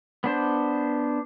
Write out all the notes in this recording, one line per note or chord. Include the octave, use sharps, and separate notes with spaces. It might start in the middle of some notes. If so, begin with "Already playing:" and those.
B3 D4 C5